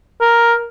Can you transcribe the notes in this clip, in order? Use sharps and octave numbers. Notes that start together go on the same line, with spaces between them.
A#4